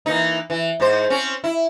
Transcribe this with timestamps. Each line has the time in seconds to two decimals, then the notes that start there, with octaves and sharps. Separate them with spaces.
0.06 E3 A#3 D#4
0.50 E3
0.80 G#2 C5
1.10 C4 C#4
1.44 E4